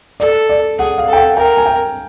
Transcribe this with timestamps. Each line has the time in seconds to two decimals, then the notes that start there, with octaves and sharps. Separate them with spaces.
0.20 A4 D5
0.49 D5
0.79 G#4 F#5
0.98 F5
1.08 A4
1.13 G5
1.17 F#5
1.36 A#4 G5
1.57 G#5
1.66 G5